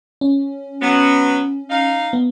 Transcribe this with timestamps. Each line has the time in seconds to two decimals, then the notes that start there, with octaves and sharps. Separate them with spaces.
0.21 C#4
0.81 F#3 B3
1.70 D#4 F5
2.13 B3